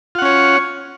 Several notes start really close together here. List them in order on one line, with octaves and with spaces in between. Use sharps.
F4 F#5 C#4 C#5